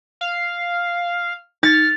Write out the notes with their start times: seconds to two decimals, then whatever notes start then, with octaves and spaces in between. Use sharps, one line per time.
0.21 F5
1.63 D#4 F6 A6